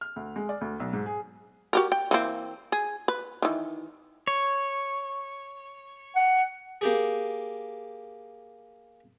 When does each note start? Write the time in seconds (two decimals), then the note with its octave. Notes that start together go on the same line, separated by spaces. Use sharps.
0.01 F6
0.16 D2
0.36 G#3
0.49 D5
0.61 D2
0.80 B1
0.93 G#2
1.06 G#4
1.73 F#4 G4 A#4
1.92 G5
2.11 E3 A#3 C4
2.72 G#4
3.08 B4
3.42 D#3 E3
4.27 C#5
6.15 F#5
6.81 A#3 G4 G#4